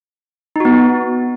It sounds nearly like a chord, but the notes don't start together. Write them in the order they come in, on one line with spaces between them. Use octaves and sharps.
D#4 F#4 B3